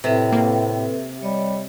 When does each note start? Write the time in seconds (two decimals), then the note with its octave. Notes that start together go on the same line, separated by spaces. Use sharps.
0.04 A2 C3 C4 A4 B4
0.32 A#3
1.23 G3 C#5 D#5